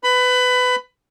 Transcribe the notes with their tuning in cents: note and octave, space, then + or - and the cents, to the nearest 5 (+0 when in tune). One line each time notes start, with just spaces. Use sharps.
B4 +20 B5 +20